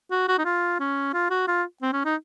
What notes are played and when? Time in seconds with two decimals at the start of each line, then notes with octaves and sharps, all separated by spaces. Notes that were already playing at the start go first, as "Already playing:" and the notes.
0.11 F#4
0.28 F#4
0.39 D#4
0.45 F4
0.80 C#4
1.13 F4
1.30 F#4
1.48 F4
1.82 C4
1.93 C#4
2.05 D#4